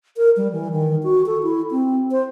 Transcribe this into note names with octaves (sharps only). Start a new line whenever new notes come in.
A#4
G3
E3
D#3
F#4
A4
E4
C4
C5